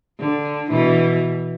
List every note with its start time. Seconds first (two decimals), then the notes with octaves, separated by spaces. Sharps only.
0.19 D3
0.71 B2 E3